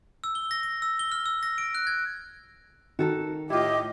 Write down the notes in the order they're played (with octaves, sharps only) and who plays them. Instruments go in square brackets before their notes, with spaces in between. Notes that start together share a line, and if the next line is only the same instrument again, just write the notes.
[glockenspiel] E6
G7
A#6
A#6
E6
G7
F6
E6
A#6
D7
F#6
G#6
[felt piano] D#3 [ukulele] F#4 A4 A#4
[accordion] A2 G4 [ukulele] E4 F4 [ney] D#5